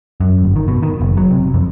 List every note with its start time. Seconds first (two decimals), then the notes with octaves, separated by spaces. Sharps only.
0.20 F#2
0.44 G1
0.56 D#3
0.68 B2
0.83 D#3
1.01 F#1
1.17 F#3
1.31 C3
1.54 F2